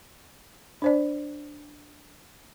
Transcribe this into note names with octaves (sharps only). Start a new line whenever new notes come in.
D4 C5 D5